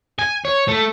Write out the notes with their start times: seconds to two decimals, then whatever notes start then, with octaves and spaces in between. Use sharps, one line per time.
0.19 G#5
0.45 C#5
0.68 A3